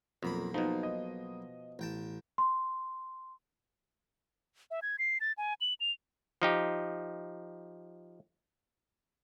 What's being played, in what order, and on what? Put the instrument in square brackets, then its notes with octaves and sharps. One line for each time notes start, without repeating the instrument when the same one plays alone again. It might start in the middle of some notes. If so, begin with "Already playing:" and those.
[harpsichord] B1 A#3 B5 [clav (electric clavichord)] F2
[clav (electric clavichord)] B2 F3 [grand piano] D#4
[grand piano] D#5
[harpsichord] A1 G5 A5
[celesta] C6
[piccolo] E5
G#6
C7
A6
G#5
F#7
F7
[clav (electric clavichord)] F3 D#4 G4